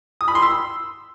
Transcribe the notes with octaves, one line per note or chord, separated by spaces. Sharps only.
D#6
B5
C6
E6